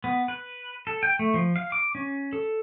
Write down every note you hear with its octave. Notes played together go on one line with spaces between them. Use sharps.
B3
B4
A4
G5
A3
F3
F5
D6
C#4
A4